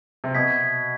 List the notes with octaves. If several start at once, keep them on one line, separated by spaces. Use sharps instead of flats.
C3
B2 D#6 G#6 B6